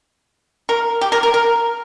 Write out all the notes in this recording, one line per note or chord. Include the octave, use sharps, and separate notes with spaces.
A#4
G4
A#4
A#4
A#4